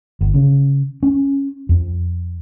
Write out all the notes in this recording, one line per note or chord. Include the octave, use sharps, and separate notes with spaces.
G1
C#3
C#4
F2